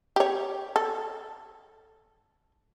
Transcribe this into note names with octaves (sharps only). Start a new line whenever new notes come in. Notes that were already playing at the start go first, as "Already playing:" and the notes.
G4 C#5
A4